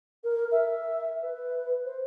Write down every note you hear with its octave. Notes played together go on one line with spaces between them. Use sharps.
A#4
E5
B4
C5